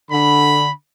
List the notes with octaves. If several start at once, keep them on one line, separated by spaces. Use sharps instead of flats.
D3 B5